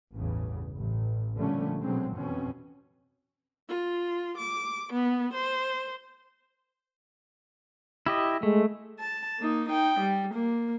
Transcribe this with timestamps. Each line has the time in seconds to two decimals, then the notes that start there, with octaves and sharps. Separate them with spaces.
0.15 A1 E2 G2 C#3
0.76 A1
1.37 A#2 D3 F3 G3 A3 C#4
1.82 B2 D3 F#3 G#3 C4
2.14 F2 B2 E3 C4 C#4
3.69 F4
4.38 D6
4.93 B3
5.34 C5
8.06 E4 G4 D#5
8.43 G#3 A3
8.99 A5
9.40 A#3 D#4
9.69 D#4 G5
10.00 G3
10.35 A#3